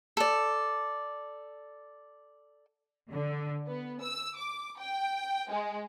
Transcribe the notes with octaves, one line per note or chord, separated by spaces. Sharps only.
A4 D5
D3
B3
E6
D6
G5
G#3